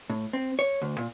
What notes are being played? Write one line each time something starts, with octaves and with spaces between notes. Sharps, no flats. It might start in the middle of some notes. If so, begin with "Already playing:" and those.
A2
C4
C#5
D2
A#2